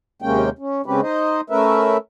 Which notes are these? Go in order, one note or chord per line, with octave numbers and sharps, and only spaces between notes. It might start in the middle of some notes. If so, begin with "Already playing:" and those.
D#2 C3 G#3 A#3 C#4 G5
C#4
C#3 G#3 C4 C#4 G4 B4
D#4 C5 D#5
A3 C#4 A#4 B4 E5